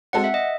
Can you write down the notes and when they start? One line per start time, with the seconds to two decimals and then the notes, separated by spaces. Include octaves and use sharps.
0.13 G#3 C4 F#4 A4 F#5
0.24 E5
0.34 D#5